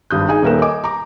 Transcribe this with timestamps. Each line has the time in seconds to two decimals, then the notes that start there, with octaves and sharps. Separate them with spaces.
0.10 G#1 G2 D#6 G6
0.28 D#4 G#4 G#5
0.43 D#1 D#2 A#4 B4 E5 E7
0.62 D#5 G#5 D6
0.84 A#5 D6